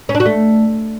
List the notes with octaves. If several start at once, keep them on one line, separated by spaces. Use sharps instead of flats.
C#4
D4
F#4
A3